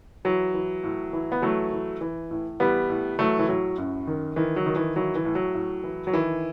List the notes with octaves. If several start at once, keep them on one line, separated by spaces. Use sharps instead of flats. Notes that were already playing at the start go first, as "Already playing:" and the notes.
E3 F#3
E3
A2
E3
B3
E3 F#3 A3
E3
E3
A2
E3 G3 B3
A2
E3 F#3 A3
E3
A2 F#3
F#2
D#3
D#3 E3
F#3
D#3
E3
E3 F#3
E3
A2
F#3
A2
E3
F#3
D#3 E3